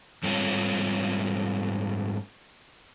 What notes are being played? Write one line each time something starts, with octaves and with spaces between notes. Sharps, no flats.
G#2 G3 A3 C4 F4 C#5